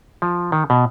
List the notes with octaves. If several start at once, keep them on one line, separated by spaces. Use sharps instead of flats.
F3
D#3
B2